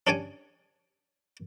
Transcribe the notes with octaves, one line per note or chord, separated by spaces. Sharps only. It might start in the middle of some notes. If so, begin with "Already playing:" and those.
C#4 D4 G4 C#5 G5 G#5